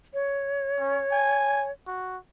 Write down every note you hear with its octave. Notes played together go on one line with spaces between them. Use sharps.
C#5
C#4
G#5
F#4